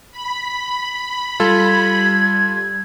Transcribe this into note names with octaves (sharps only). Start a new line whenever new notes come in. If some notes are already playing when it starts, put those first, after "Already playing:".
B5
G3 F4 A4 G#6